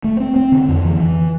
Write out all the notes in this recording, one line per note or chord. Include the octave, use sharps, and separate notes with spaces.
A3
C4
C4
D3
F2
E3
E3